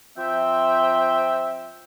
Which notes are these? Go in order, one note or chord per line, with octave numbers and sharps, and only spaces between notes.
F3 C4 E5 G5